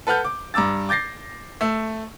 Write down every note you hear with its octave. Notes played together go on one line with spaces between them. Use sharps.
A4 B4 F#5 F6 G6
D6
G2 A#5 D6 E6 A6
D6 G6 A6 A#6 C7
A3 E6